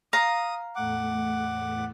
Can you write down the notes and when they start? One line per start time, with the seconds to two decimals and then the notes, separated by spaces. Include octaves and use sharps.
0.13 F5 A#5 D#6
0.76 E2 A2 A3 F#5 D6